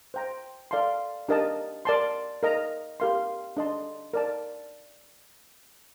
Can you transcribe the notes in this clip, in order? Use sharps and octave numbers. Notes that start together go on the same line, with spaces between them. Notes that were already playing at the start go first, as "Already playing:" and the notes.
C5 G5 A#5
A4 D5 F5 A5 C6
D4 G4 A#4 D#5 A5
A#4 D5 A5 C6
A#4 D#5 A#5
G4 A#4 F5 C6
D4 A4 D#5 A5 C6
A#4 D5 A5